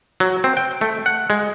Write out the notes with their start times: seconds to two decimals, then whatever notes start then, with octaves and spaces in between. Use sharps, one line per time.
0.20 F#3
0.44 C4
0.57 G5
0.81 A3
1.06 F#5
1.30 G#3